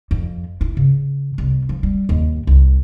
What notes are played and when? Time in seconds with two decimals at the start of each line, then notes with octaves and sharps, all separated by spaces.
0.11 F2
0.61 E4
0.77 C#3
1.38 C2
1.69 F3
1.83 G3
2.09 D#2
2.47 C2